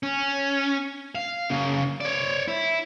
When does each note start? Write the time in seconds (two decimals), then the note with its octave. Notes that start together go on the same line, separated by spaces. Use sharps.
0.03 C#4
1.15 F5
1.50 C#3 A#3
2.01 C#5 D5
2.48 E4